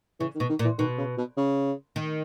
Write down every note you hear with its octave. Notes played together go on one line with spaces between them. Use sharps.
C#3 E3
D#3
B2
D#3
A#2
E3
B2 D#3
C#3
B2
C#3
D#3